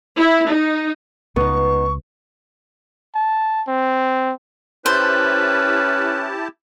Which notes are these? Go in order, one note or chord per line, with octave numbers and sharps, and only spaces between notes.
E4
D#4
C#2 B3 D#4 C#6
A5
C4
C#4 E4 G4 B4 C5 A5